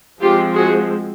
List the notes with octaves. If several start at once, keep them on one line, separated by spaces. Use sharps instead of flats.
F3 G#3 C4 F4 G4
F#4 G#4